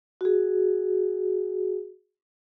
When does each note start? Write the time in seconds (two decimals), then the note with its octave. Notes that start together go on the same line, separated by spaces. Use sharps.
0.21 F#4 G#4